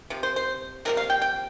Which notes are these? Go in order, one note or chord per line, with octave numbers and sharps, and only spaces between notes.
C3 F3
C5
C5
C3 F3 A#3 A#4
F5
G5
G5